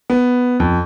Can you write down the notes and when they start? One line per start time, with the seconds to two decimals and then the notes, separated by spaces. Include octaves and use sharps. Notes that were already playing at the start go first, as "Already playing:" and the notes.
0.10 B3
0.60 F2